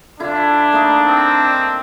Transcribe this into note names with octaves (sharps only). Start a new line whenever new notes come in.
D3 D4 E4 F4
A3 A#3 D#4
C4